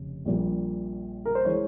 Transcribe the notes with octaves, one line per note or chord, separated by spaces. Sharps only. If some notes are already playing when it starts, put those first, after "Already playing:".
Already playing: F1 C#3
A#1 A#2 G3
A#4
C5
E3 G#3 C#5